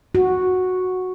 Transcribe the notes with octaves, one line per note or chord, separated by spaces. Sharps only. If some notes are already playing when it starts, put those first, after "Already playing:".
F#4